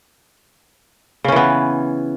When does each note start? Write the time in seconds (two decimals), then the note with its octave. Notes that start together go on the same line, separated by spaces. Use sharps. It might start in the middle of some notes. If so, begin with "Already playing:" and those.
1.24 C#3
1.28 C#4
1.32 E3
1.36 B3